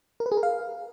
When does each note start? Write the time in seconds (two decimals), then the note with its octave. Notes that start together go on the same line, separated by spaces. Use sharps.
0.20 A#4
0.26 B4
0.32 G#4
0.37 A#4
0.43 F5